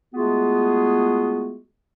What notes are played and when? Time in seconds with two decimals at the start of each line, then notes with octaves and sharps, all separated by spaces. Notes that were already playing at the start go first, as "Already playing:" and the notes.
0.14 G#3 A3 B3 F4 F#4 G#4